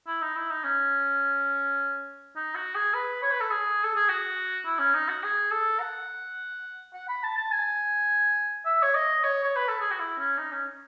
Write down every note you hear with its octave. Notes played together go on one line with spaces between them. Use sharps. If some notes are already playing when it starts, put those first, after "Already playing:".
E4
D#4
E4
D#4
C#4
D#4
F#4
G#4
B4
C#5
B4
A4
G#4
A4
G#4
F#4
E4
C#4
D#4
F#4
G#4
A4
F#5
F#5
B5
A5
A5
G#5
E5
C#5
D#5
C#5
C#5
B4
A4
G#4
F#4
E4
C#4
D#4
C#4